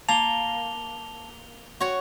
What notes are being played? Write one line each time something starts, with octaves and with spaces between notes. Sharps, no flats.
A#3 A5 F7 G7
F#4 C#5